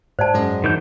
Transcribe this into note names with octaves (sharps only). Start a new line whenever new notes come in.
G#2 C5 D5 A5
F#2 G#3
D#3 E3 G6